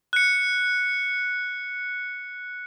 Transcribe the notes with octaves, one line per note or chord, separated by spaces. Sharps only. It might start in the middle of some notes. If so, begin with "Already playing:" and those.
F#6 C#7